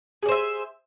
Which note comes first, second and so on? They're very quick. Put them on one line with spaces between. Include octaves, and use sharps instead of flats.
G#4 D5 C5 E5